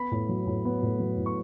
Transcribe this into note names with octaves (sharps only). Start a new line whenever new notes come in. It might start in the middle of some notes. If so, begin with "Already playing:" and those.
Already playing: B3 B5
A2
F#3
A2
B3
A2
F#3
A2
C#6